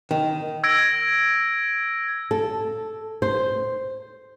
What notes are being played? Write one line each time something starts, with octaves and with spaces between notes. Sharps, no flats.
D#3
E6 G#6 A#6 D7
A4
C5